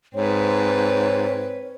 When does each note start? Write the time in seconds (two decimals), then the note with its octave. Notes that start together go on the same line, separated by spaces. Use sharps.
0.15 G#2 C4 B4 C#5